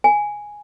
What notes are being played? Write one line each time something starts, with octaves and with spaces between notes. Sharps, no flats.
G#5